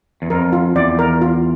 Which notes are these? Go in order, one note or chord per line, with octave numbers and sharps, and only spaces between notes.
E2
F2 A#4
F4
E2 D5
A#4
F4